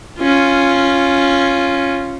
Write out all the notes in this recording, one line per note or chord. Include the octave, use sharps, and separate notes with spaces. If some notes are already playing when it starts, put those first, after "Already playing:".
C#4 F4